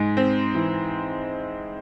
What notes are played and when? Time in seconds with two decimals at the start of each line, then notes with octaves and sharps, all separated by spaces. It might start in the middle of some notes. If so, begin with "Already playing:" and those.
Already playing: G#2 G#3
0.17 C4
0.55 E3